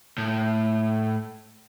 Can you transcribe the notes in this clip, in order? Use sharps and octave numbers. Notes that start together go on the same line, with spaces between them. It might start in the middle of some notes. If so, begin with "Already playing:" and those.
A2